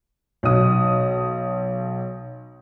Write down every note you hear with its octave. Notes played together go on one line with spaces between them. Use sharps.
B1 D#6